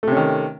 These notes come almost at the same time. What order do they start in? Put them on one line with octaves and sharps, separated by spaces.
A3 C3 C#4 D#3